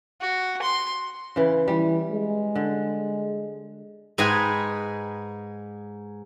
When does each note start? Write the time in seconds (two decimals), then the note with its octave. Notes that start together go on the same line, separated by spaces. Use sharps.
0.21 F#4
0.62 C6
1.36 C#3 E3
1.68 E3 G3
2.11 G#3
2.56 D3
4.18 G#2 G#4 B4 D#5 G5 G#5